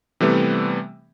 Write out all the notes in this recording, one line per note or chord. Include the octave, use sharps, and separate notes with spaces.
C3 E3 G3 A3 B3 C4